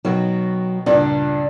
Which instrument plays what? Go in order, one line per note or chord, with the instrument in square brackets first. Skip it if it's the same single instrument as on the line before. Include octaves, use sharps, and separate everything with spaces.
[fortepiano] B2 D#3 [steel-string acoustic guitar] F#3
[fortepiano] C#2 G2 A#2 [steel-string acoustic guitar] D4